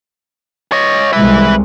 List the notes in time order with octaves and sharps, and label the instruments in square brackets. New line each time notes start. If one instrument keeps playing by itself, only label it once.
[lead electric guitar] C#5 D#5
[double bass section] C2 G#3 [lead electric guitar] B4 E5